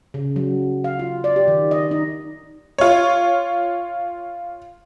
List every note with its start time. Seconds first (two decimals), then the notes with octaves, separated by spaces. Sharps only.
0.14 C#3
0.36 F#3
0.84 F5
0.99 F4
1.24 D5
1.36 G4
1.48 D#3
1.71 D#5
1.91 D#4
2.78 F4 C#5